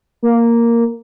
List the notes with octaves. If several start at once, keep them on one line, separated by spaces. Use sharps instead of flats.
A#3